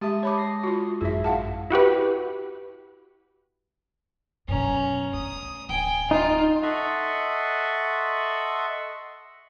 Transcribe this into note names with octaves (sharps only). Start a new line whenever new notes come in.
G#3 G4 E5 A5 D#6
C#5 B5 D6
A#6 C7
F4 F#4
A1 F#2 E4 G#4 E5
F5 F#5 A5
E4 F#4 G4 B4
F#2 B2 C#4 A#5
A3 D#6
D1 G5 G#5
D#4 F4
A4 D#5 E5 F#5 C6 C#6